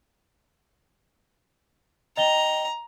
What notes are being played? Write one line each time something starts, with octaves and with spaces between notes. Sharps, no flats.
D#5 G5 A#5 G7